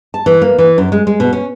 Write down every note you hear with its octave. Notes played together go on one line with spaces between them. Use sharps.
A5
E3
A#3
E3
F#2
G#3
G#3
B2
C#4